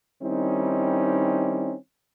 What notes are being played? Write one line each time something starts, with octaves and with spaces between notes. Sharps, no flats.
D#3 G3 C4 C#4 D#4 E4